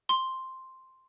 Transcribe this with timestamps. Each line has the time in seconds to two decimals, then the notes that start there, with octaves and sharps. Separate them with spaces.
0.09 C6